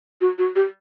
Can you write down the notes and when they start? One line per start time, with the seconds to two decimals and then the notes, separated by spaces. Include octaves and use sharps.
0.21 F#4
0.38 F#4
0.56 G4